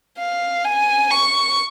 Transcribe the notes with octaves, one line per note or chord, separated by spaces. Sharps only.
F5
G#5
C#6